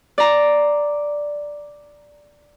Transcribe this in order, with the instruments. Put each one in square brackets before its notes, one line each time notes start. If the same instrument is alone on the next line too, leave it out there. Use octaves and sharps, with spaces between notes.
[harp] D5 A#5